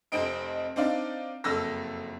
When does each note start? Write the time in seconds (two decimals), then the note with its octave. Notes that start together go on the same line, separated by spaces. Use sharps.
0.12 F1 F2 C4 D#5 D7
0.76 C4 D4 D#4 D5 F5
1.44 F#1 F2 A4 E6 A#6